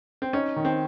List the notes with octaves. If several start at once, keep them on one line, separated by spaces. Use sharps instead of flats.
C4
C#4 D#4
D#3
C4